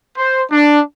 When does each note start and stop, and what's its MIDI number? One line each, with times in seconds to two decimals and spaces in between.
0.16 0.43 72
0.51 0.80 62